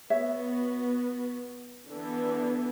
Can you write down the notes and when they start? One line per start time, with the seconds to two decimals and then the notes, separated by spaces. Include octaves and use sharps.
0.10 B3 F#4 C#5 E5
1.88 D3 E3 B3